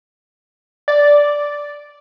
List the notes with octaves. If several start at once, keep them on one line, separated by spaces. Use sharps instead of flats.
D5